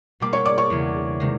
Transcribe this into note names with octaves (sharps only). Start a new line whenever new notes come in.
B2 G3 A#3 D6
C#5 C#6
D5 D6
C#5 C#6
E2 C#3 E3
C3 D#3 G#3